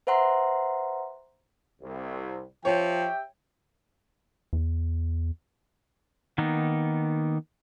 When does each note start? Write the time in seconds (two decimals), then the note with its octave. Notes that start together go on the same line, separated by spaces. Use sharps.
0.07 B4 C5 E5 F#5 A#5 C6
1.82 C2
2.65 F3 G4 C#5 E5 G5
4.53 E2
6.38 D#3 A#3 B3 D#4